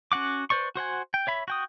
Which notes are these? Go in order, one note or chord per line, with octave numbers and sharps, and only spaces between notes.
C#4 F#4 F#5 D6
B4 C5 D5 C#6
F#4 C5 F#5 G#5
G5
C#5 E5 B5
F#4 G5 D#6